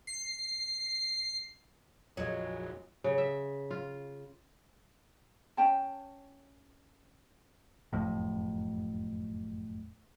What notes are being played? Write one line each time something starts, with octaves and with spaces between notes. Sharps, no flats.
C7
A#1 F2 F3 F#3 G#3
C#3
E5
F4
C#4 G5 A5
F#1 F2 A2